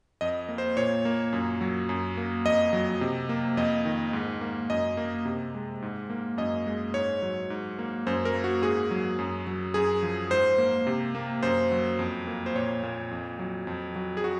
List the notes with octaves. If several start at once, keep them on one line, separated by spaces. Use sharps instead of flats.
F2 D#5
A#3
C5
A#2 C#5
A#3
F#2
F#3
F#2
A#3
F2 D#5
F#3
C3
A#3
F2 D#5
D#3
G#2
A#3
F#2 D#5
A#3
C3
G#3
G#2
A#3
F#2 D#5
G#3
G#2 C#5
F#3
G#2
A#3
F#2 C5
A#4
A#3
F#4
G#2 G#4
F#3
F#2
F#3
F#2 G#4
F3
G#2 C5
A#3
C3
A#3
F#2 C5
F#3
F2
A#3
C5
A#2 C#5
A#2
F2
F#3
F2
F#3
G#4
F#4